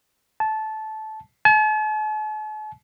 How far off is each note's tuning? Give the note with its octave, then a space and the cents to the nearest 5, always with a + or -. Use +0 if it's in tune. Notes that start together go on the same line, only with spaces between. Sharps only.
A5 -15
A5 -45